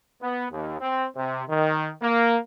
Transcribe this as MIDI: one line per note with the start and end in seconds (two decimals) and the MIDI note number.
0.21 0.46 59
0.52 0.77 39
0.81 1.06 60
1.16 1.44 48
1.49 1.90 51
2.02 2.37 58